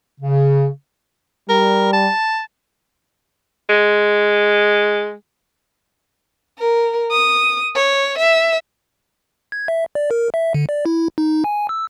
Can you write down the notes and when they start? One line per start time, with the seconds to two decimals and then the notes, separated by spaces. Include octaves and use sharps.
0.20 C#3
1.49 G3 A#4
1.93 A5
3.69 G#3
6.59 A#4
7.11 D#6
7.75 C#5
8.18 E5
9.52 G#6
9.68 E5
9.95 D5
10.11 A#4
10.34 E5
10.54 D3
10.69 D5
10.86 E4
11.18 D#4
11.44 G#5
11.69 E6